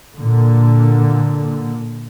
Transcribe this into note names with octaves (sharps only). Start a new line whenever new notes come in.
A#2 D3